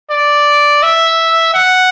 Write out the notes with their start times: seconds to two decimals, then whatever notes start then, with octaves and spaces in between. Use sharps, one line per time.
0.10 D5
0.83 E5
1.54 F#5